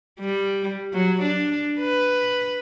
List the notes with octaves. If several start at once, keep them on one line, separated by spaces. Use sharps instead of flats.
G3
F#3
D4
B4